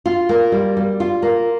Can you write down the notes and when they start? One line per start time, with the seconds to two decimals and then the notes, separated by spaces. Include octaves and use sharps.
0.06 F4
0.29 A#3
0.52 G3
0.77 G3
1.00 F4
1.22 A#3